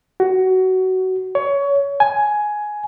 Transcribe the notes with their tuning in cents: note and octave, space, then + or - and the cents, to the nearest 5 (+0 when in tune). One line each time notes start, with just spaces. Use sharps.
F#4 +20
C#5 +20
G#5 +10